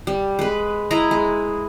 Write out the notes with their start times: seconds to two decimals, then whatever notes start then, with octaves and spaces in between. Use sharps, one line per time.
0.07 G3
0.39 G#3 B4
0.91 E4 B4 D#5 A#5
1.11 G#3